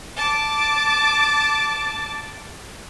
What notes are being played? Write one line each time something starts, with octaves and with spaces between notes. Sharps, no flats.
A5 D6